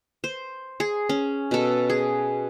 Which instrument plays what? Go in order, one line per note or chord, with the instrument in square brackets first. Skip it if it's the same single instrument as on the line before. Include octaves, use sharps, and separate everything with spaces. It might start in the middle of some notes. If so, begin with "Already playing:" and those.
[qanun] C5
G#4
C#4
B2 A4
G#4